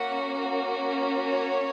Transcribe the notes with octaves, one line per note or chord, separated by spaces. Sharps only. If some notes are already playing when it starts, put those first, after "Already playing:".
Already playing: A#3 C#4 F#4 F#5
C#5